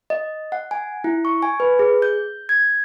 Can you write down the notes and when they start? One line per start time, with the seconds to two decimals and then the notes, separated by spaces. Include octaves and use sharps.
0.10 D#5
0.52 F#5
0.71 G#5
1.04 E4
1.25 C#6
1.42 G#5
1.60 B4
1.79 G#4
2.02 G6
2.49 G#6